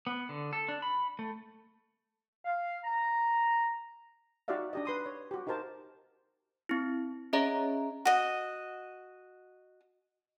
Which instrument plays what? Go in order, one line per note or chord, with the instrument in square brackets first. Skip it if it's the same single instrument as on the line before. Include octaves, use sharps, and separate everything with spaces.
[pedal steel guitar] B3
D3
A4
D4
B5
A3
[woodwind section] F5
A#5
[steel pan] D#4 F#4 G4 D5 E5 F5
D4 G4 D#5
B4 C6 D#6
C#5
F#4 G4
D#4 G4 A#4 C5 A5
[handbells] C4 E4
C#4 G#4 C#5 D#5 E5 A#5
[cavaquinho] F#4 D#5